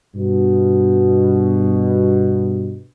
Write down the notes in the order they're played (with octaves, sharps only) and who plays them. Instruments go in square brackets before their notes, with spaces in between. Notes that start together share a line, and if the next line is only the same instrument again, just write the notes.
[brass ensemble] G2 B2